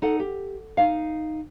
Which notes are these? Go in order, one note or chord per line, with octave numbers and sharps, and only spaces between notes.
D#4 A4 F#5
G4
D#4 F5